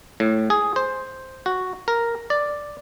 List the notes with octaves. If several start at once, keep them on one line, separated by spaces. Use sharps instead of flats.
A2
G#4
C5
F#4
A#4
D5